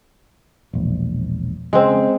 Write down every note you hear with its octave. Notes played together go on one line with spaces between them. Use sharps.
E1 A#1
C#3 G#3 C4